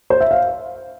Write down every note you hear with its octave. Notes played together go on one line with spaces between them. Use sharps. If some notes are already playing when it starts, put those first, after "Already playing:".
C5
E5
F5